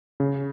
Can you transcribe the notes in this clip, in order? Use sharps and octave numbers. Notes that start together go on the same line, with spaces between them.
C#3